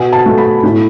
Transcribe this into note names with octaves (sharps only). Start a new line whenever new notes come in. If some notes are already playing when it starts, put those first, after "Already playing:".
Already playing: B2 G#5
A5
A3
B5
A2